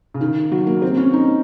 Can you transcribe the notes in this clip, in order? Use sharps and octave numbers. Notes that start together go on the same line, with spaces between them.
C#3
D#3
F#3
A#3
C4
C#4
D#4